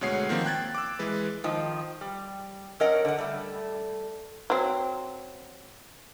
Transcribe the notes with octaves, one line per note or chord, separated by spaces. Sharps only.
D2 B2 G#3 C#5 F#5 C7
D#3 F3 A#3 C4
G5 F#6 G#6 A6
D6 E6
E3 G#3 B4
D#3 F3
G3
F#3 C#4 A#4 D#5 F#5
D3 F#5
G3 A3
F#3 C4